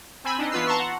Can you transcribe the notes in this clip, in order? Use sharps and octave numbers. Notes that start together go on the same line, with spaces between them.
C4 G#5 B5 E6
D4 D#4 D#5
E3 B3 F4 B4 E6 C7
A5 A#5 C6 C#6
F#5